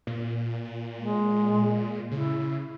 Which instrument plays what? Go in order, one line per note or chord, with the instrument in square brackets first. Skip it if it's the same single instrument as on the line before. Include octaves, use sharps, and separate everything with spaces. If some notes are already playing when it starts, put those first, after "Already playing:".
[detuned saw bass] A#2
[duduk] G#3
[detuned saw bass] C#3 [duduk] E4